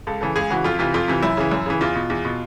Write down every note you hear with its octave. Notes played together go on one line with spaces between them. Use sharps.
C#2 A4
C#3 E3 A4
C#2 G#4
C#3 E3 F#4
F2 F4
C3 E3 F4
F2 F4
C3 E3
F#2 E4
C#3 E3
F#2
C#3 E3
E2 F4
B2
E2
B2